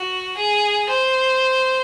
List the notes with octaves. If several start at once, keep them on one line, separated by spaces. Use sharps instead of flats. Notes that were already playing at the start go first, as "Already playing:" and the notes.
Already playing: F#4
G#4
C5